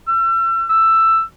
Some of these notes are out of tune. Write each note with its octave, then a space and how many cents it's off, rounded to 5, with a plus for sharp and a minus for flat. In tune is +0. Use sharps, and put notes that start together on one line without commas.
E6 +35
E6 +10